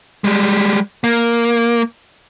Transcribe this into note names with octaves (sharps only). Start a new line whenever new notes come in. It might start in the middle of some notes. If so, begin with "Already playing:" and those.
G3 G#3
A#3